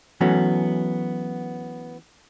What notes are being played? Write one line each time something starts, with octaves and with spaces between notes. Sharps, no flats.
E3 F#3 A3 B3 C#4 F#4